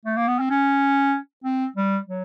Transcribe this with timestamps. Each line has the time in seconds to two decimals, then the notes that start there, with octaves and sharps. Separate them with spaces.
0.05 A3
0.16 A#3
0.27 B3
0.39 C4
0.50 C#4
1.44 C4
1.76 G3
2.08 F#3